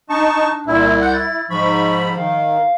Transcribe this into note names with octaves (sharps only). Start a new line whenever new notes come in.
D4 D#4 A5 C#6
C2 A#2 E4
F#5 G6
E4 A6
G#2 F3 B5 C#6
D#3 F5